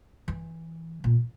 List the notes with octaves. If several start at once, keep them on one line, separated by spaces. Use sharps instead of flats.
E3
A#2